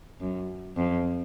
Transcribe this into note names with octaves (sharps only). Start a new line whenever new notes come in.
F#2
F2